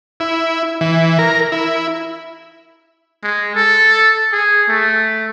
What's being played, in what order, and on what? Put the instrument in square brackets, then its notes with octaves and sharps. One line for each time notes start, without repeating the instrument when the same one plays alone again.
[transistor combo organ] E4
E3
A#4
E4
[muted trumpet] G#3
A4
G#4
A3